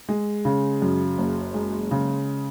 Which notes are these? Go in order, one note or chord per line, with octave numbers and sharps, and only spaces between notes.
G#3
C#3
F#2
F#1
G#3
C#3